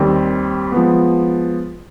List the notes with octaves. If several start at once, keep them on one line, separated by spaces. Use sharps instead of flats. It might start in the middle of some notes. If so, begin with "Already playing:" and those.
Already playing: D#2 D#3 G3 C4
F3 G#3 B3